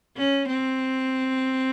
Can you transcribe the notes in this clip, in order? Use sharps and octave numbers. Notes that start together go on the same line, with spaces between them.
C#4
C4